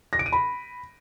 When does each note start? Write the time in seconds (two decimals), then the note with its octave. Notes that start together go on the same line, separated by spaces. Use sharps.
0.13 A#6
0.19 D7
0.26 D#7
0.32 B5